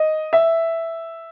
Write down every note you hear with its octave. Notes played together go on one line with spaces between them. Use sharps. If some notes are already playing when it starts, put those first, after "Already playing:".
Already playing: D#5
E5